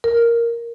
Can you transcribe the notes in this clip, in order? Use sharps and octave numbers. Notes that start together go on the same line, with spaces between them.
A#4